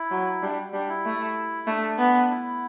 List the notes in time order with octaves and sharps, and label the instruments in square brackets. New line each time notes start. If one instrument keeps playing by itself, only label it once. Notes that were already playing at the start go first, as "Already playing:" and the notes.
Already playing: [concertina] E4
[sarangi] F#3
[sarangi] G3 [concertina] D4
[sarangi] G3 [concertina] D4
[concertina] E4
[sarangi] A3
[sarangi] A3 [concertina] D4
[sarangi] B3
[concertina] E4